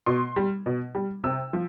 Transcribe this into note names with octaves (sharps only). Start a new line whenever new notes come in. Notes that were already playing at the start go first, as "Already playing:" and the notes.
B2 C6
G3
B2
G3
C3 E6
F3